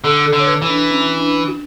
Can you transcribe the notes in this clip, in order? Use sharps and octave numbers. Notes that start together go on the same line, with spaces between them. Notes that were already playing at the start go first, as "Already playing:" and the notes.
D3 A4
A4
D3
C#5
B4
E3
D4
C#4
D4
F#4